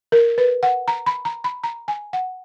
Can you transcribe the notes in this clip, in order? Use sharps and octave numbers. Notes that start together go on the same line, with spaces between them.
A#4
B4
F#5
A#5
B5
A#5
B5
A#5
G#5
F#5